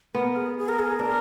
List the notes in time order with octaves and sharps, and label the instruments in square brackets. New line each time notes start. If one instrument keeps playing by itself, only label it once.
[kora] B3 [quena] A#4
[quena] G#4
G#4
A#4
G#4
[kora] D4 [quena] A#4